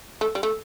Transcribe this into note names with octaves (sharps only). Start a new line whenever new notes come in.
A3
G3
A3